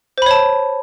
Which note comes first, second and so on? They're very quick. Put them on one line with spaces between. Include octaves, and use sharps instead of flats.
C5 B5 C#5 A5